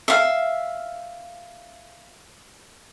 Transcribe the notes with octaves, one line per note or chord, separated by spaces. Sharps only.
E5 F5